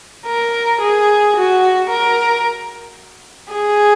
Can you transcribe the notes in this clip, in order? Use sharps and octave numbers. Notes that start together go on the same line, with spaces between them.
A#4
G#4
F#4
A#4
G#4